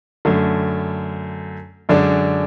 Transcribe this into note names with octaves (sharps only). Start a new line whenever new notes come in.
F#2 D3 A3
F#2 D3 G#3 D4